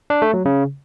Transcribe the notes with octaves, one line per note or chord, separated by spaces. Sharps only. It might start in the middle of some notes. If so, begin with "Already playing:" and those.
D4
A3
F#3
C#3